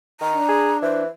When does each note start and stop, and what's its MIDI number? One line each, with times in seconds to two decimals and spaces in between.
0.21 0.38 51
0.21 0.81 82
0.33 1.03 62
0.48 0.73 68
0.82 1.07 52
0.82 1.02 72